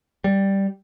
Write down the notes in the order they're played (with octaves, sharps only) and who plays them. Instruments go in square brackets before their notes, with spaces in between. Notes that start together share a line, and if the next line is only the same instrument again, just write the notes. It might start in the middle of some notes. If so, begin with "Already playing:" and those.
[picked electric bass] G3